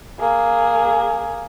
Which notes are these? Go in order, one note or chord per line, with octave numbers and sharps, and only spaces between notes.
A#3 G#4